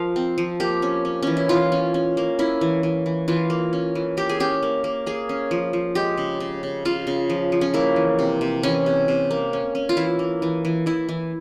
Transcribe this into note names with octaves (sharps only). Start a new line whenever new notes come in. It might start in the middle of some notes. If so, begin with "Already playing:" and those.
Already playing: F3 A#4 F5
C4
F3
A#3 G4
C#4
C#4
E3 C#4
E4
E3 F4
C#4
C#4
A#3
C#4 E4
E3
E3
E3
E3 F4
A#3
C#4
E3
A#3 G4
G#4
C#4 G4
A#3
A#3
A#3 G#4
C#4
F3
F3
G#3 G4
C#3
C#3
C#3
C#3 F4
C#3
F3
F3
C#4
A#3 E4
E3
C3
C3
E3 C#4
C3
C3
A#3
C#4
C#4
F4
E3 E4
A#3
E3
E3
E3 E4
E3